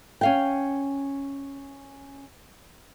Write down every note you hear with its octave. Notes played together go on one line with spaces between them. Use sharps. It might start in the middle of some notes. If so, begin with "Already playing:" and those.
C#4 F5 G5